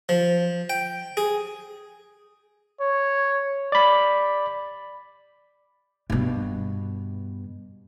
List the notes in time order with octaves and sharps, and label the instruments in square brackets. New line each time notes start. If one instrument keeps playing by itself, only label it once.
[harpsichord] F3
G5
G#4
[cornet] C#5
[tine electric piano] D5 B5
[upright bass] G2 B2